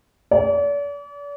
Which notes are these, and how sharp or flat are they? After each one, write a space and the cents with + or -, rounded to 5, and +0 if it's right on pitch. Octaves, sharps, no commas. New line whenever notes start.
D5 -40